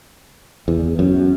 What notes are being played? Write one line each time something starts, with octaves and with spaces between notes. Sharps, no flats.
E2
F#2